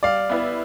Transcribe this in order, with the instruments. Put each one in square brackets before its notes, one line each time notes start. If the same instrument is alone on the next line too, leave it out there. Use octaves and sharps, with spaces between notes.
[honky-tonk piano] G3 [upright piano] D5 F5
[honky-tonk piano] B3 E4 B4